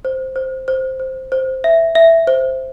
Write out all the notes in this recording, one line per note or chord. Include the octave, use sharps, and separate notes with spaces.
C5
C5
C5
C5
C5
E5
E5
C5